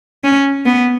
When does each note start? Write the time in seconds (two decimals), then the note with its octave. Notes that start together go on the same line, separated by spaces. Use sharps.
0.24 C#4
0.66 B3